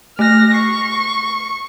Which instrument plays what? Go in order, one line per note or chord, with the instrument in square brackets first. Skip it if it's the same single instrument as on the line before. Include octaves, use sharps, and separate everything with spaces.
[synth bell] A3 F#6 [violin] F6 A#6
[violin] C#6 [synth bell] C7